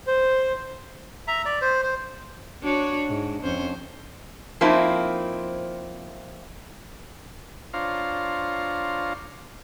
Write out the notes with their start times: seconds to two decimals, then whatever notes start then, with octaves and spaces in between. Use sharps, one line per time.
0.07 C5
1.28 E5 A#5
1.45 D5
1.61 C5
1.83 C5
2.63 D4 F#4 C#5
3.08 G#2
3.43 F2 C#4 C5
4.61 F3 A#3 C4 D#4 E4
7.73 D4 F4 C5 C#5 F5 A#5